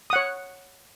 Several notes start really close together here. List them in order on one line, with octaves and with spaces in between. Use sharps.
D#6 F#5 C#5